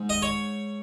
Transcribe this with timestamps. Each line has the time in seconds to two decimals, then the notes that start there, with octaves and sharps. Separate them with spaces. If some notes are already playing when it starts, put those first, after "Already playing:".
Already playing: G#2 G#3
0.09 D#5
0.22 C#5